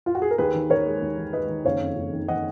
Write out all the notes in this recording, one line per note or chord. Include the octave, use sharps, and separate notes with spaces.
F4
F#4
G#4
A#4
D#2 G#4 B4
D#3
D#3 A#4 C#5
G#3
D#2
D#3
G#3 B4 D#5
D#3
F#1 C#5 F5
F2
F#1
D#3
D#3 D#5 F#5